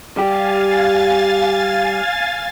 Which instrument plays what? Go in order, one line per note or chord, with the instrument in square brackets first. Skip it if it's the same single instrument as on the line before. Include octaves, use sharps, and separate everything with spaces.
[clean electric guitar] G3 G4 [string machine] F5 G#5 A6